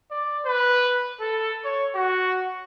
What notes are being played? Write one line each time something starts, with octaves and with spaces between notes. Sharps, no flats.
D5
B4
A4
C#5
F#4